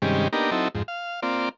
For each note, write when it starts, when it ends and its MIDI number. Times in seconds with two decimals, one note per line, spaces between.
0.02 0.28 43
0.02 0.28 48
0.02 0.28 51
0.02 0.28 55
0.02 0.28 56
0.02 0.28 61
0.33 0.51 58
0.33 0.51 59
0.33 0.51 62
0.33 0.51 63
0.33 0.51 67
0.33 0.51 70
0.51 0.68 54
0.51 0.68 60
0.51 0.68 63
0.51 0.68 64
0.51 0.68 69
0.75 0.83 41
0.75 0.83 44
0.88 1.20 77
1.23 1.49 58
1.23 1.49 60
1.23 1.49 65
1.23 1.49 74